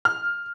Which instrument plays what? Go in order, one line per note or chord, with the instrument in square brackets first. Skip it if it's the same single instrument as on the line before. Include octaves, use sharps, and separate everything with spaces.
[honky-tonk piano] F6